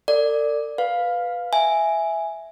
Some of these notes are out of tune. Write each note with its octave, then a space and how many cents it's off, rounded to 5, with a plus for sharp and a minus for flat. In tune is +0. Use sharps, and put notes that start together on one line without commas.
A4 +45 D5 +0
B4 +0 F5 +10
E5 +0 G#5 +0